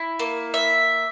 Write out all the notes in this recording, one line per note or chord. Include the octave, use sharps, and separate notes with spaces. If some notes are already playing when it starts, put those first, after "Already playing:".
Already playing: E4
A#3
E5